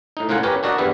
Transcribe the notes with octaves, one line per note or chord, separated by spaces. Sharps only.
A2 D#4
C#2 A2 F4 A#4 F#5 G#5
C#4 G4 A#4 B4 C#5
D4 F#4 A#4 D5 D#5 F#5
E2 G2 G3 B3 E4 E5